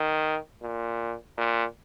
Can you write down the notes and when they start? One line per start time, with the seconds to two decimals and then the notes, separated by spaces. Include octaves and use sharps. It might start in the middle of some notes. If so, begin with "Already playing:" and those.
Already playing: D#3
0.62 A#2
1.38 A#2